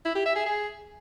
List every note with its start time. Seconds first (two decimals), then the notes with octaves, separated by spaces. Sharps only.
0.05 E4
0.15 G4
0.25 E5
0.36 G#4
0.46 G#4